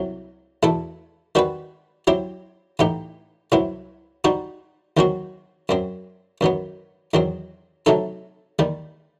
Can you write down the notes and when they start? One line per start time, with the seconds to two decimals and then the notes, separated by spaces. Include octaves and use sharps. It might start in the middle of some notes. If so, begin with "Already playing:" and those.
Already playing: C2 C3 F#3
0.63 E2 B2 A3 E4 A4
1.35 D#3 G3 C4 F#4 B4
2.07 F#3 C4 E4 G4
2.79 A2 E3 B3 D#4 G4
3.52 C2 C3 F#3 B3 E4
4.24 G3 D#4 F#4 C5
4.97 D#2 D#3 F#3 C4 F#4
5.69 F#2 F#3 C4
6.41 F#2 D#3 F#3 B3
7.14 E2 D#3 F#3 C4
7.86 C3 F#3 A3 D#4 A4
8.59 D#2 D#3 G3